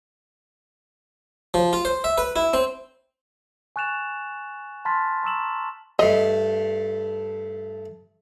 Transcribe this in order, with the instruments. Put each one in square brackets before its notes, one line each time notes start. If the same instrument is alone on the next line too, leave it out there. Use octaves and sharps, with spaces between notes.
[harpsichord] F3
F4
C5
E5
B4
E4
C4
[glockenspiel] G#5 C#6 F#6 A6 E7 F7
A5 B5 C6 F6 A6 B6
A#5 C#6 E6 E7 F#7
[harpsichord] G2 A3 [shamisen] D#5